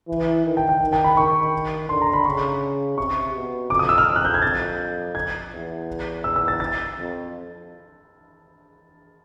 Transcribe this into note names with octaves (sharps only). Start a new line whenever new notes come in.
E3
D#3
G5
G5
D#3
G5
B5
D#3 C#6
D3 C6
A#5
B5
C#3 C#6
C3 C#6
B2
F2 D6
D#6
E6
F6
F2
F#6
G6
G#6
F2 A6
G#6
E2
E2 E6
E6
A6
A6
F2